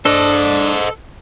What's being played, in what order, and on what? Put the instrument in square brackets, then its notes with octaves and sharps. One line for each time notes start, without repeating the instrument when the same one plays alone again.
[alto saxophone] D4 [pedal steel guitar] A4 [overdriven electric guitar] C5 D#5